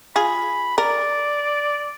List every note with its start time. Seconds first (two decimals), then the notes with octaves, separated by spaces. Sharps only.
0.16 F4 G#4 B5
0.78 A#4 D5